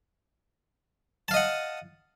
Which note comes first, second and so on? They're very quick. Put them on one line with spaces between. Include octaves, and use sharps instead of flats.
A5 F5 D#5 F#5